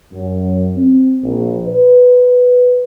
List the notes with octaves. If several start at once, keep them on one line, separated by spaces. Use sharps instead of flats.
F#2
C4
A#1
B4